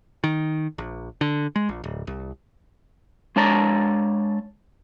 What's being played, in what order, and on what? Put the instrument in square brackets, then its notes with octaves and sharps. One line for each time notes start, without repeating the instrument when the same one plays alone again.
[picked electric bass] D#3
A#1
D3
G#3
A#1
D1
C2
[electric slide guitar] G#3 D4 C#5 A5 A#5